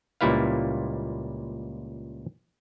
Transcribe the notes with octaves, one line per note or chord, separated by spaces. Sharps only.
C#2 A#2 G3 E4 B4 F5